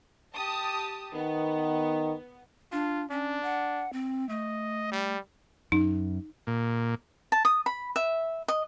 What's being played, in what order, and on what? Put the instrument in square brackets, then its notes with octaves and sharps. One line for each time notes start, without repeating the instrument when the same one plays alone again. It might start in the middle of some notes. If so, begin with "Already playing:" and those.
[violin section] G4 A5 D#6
[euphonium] D#3 [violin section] B3
[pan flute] D4 [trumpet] F4
[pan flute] C#4 [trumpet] D4
[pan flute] F#5
C4
[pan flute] A3 [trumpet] D#5
[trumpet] G3
[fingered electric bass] F#2 [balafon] D#4
[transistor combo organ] A#2
[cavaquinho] A5
D#6
B5
E5
D#5